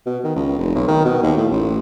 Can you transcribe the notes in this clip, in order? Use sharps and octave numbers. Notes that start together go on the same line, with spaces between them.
B2
D#3
C#2
F1
B1
D#3
B2
D#2
A2
A1